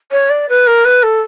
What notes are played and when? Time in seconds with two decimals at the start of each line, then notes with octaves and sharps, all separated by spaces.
0.11 C#5
0.29 D5
0.49 B4
0.66 A#4
0.84 B4
1.02 A4